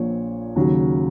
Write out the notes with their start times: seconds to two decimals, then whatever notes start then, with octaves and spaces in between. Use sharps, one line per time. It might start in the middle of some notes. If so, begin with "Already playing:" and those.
Already playing: A#1 A#2 F3 C#5
0.56 D#2 C#3 F#3